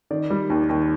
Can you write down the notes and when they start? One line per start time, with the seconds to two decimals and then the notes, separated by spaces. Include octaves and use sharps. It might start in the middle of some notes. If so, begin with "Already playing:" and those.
0.11 D#3 D5
0.30 G3
0.50 D#2
0.69 D#2